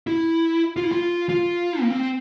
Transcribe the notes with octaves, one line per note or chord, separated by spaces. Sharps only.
E4
F4
E4
F4
F4
A#3
C4